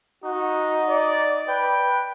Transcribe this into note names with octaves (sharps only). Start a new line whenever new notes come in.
D#4 F#4
D5
B4 G5